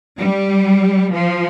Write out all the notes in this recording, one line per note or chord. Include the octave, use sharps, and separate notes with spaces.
G3
F3